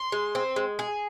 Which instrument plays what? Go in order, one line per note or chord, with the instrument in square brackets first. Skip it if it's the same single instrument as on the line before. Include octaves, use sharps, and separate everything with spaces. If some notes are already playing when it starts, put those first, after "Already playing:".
Already playing: [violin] C6
[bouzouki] G#3
C4
G#3
G#4